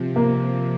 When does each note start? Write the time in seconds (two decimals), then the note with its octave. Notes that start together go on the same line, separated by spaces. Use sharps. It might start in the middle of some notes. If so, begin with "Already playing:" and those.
Already playing: C3 F3
0.16 A#3